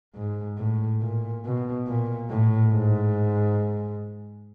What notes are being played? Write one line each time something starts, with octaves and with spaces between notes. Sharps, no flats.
G#2
A2
A#2
B2
A#2
A2
G#2